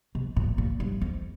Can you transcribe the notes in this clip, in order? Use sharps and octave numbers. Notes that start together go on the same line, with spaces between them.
B2
A#2
A#2
G2
F2